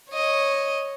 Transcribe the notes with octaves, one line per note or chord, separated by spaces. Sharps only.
C#5 D#5